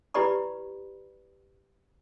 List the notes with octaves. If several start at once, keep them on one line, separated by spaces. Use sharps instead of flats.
E4 G4 B4 D5 B5 C#6